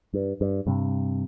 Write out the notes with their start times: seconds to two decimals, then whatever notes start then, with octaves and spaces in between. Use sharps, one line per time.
0.14 G2
0.41 G2
0.67 G2 C3